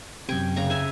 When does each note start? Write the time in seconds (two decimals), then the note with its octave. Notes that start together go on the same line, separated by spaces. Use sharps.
0.29 F#2 C3 G5 G#5 C#6
0.56 C#3 A#5 C#6
0.70 E5 G#5